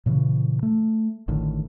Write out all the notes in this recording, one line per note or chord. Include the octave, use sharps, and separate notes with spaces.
A#2 C#3 E3
A3
A1 A2 D3 D#3